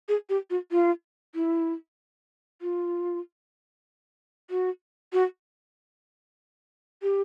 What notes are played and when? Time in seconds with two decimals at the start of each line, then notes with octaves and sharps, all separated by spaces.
0.09 G#4
0.30 G4
0.50 F#4
0.72 F4
1.35 E4
2.62 F4
4.50 F#4
5.13 F#4
7.02 G4